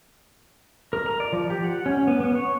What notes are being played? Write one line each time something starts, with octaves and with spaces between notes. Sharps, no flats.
A#4
A#5
D5
F3
G4
F#5
C#4
B3
B3
C#5